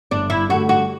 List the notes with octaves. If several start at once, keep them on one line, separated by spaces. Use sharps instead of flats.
G1 D4
E4
G2 D3 A3 F#4
F#4